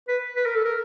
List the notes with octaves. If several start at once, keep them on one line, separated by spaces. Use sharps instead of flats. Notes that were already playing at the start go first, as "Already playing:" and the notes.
B4
B4
A#4
A4
A#4